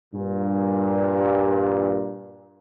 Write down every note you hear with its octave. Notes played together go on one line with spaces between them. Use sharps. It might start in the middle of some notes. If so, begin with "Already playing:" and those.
G2 A#2